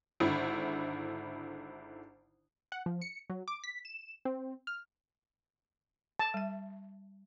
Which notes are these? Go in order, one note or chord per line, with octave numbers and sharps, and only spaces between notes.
G#1 D3 E4
F#5
F3
C#7
F#3
D6
B6
E7
C4
F6
A5
G3 E5